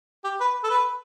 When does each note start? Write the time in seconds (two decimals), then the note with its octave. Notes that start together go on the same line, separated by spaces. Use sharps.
0.24 G4
0.40 B4
0.64 A4
0.70 B4